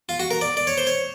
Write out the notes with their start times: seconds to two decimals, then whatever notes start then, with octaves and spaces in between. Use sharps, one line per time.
0.09 F4
0.20 F#4
0.31 A#4
0.41 D5
0.57 D5
0.67 C#5
0.77 C5
0.87 C#5